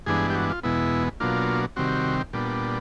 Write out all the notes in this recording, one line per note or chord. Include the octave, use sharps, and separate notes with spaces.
G2 E3 G#3 B3 D4 G#4
G4
F#4
F4
E2 B2 G#3 B3 E4
B2 F#3 A#3 D4 F4
C3 D#3 G3 C4 F#4
A#2 G3 B3 D4